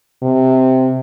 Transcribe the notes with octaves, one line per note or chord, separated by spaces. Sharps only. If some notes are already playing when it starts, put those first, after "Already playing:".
C3